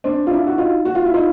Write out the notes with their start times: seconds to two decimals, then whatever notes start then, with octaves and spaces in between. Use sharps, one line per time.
0.04 C4 D4
0.27 F4
0.31 D4 E4
0.47 F#4
0.58 D#4 F4
0.85 F#4
0.95 F4
1.05 E4
1.14 D#4 F4